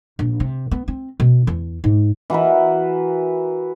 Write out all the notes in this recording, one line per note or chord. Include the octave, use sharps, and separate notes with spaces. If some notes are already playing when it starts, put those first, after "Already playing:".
A#1
C3
B3
C4
B2
E2
G#2
E3 F#4 A#4 B4